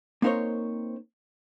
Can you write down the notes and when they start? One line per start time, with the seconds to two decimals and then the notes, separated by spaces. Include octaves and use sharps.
0.22 A#3 C4 D#4 A#4 C5 C#5